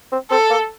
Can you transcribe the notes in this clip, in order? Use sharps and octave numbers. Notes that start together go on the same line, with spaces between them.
C4
C4 A4
A#3